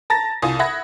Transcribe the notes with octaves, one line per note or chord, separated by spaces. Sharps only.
A5 A#5 A6 A#6
C2 F4 G#5 D#6
E5 F#5 B5 G#6 A#6